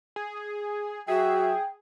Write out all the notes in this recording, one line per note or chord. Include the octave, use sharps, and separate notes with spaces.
G#4
F#3 F#4 G#4 E5 G5